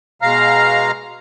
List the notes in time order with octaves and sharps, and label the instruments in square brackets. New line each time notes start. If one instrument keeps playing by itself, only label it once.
[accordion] B2 G#3 F5 A#5 F6